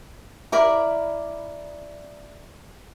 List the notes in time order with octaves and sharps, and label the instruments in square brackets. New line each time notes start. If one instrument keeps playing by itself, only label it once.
[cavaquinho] E4 A#4 D5 B5